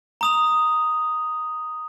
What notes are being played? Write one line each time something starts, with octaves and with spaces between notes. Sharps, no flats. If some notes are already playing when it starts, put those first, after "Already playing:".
A#5 D#6 F7